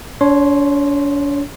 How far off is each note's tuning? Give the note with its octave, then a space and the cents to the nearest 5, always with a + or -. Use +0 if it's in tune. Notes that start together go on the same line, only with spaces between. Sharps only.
D4 -45 C#5 -5 C6 +0